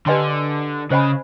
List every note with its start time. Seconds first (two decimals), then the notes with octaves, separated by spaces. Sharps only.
0.06 D3 G4 B4 D#5 G#5 C6
0.91 C#3 C5 D#5 G#5 B5